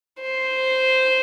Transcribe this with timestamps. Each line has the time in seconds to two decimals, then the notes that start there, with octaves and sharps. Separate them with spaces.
0.21 C5